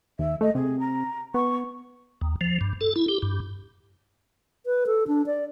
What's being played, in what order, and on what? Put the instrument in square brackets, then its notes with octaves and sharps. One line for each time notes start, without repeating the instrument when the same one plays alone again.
[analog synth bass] D#2 [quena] E5
[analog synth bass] A3 [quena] D#5
[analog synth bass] C3 [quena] G#4
[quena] A#5
[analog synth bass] B3 [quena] C#6
[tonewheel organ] D#2
F3
G2
A4
E4
G4
G2
[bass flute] B4
A4
D4
D5